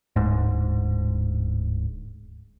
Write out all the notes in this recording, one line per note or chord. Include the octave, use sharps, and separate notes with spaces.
D1 G#2